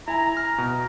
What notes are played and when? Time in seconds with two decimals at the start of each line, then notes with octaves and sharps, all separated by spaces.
0.08 E4 G#5 A#5
0.37 F6
0.58 B2